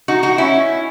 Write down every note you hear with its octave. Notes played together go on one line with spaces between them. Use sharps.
D#4 F#4
D#4 F#4
C#4 E4